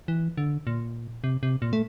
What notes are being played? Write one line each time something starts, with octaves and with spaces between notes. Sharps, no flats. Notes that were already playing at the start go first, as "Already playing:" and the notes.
E3
D3
A#2
C3
C3
A#2
A3